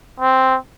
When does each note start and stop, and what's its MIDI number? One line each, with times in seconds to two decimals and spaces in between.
0.20 0.57 60